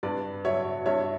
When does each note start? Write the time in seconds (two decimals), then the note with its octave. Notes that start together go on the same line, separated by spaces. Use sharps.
0.03 G2 B4 D5
0.45 F#3 C#5 E5
0.86 G2 C#5 E5